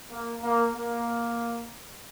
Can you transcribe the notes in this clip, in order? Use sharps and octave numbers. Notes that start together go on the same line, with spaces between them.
A#3
A#3
A#3